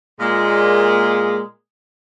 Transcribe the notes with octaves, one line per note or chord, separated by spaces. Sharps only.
A#2 G#3